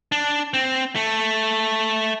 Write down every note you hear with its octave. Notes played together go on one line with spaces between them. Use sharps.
D4
C4
A3